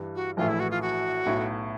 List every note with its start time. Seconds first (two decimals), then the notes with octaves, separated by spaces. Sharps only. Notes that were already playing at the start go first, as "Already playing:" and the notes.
Already playing: G2 E3 G3
0.15 F#4
0.37 A#1 A2 E3 A3 F4
0.49 E4
0.60 F#4
0.71 F4
0.82 F#4
1.26 B1 A2 F#3